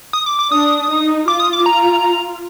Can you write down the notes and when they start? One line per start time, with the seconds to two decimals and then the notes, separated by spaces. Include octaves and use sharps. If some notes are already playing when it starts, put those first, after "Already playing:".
0.13 D#6
0.26 D6
0.39 D6
0.51 D4 D#6
0.90 D#4
1.27 F4 D6
1.40 D#6
1.53 D6
1.66 A#5